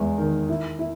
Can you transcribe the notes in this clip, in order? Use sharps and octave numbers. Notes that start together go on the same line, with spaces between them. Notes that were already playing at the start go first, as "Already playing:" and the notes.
Already playing: E2 G#3
D#3
E4
E4